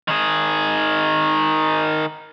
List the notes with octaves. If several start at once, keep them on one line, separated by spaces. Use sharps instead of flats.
D#3 G#4